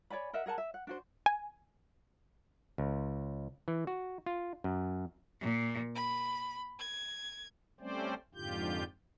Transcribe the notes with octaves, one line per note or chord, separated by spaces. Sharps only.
C#5 D5 G#5 B5
A#4 D#5 E5 F#5
G#4 A#4 F#5 A5
E5
F#5
D4 F#4 C5
G#5
C#2
E3
F#4
F4
F#2
A#2
B5
G#6
G3 A3 C4 C#4 C5 D5
F2 G#2 D3 F4 G4 G6